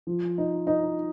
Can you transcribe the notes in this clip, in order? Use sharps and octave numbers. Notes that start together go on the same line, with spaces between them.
F3
D#4
D#4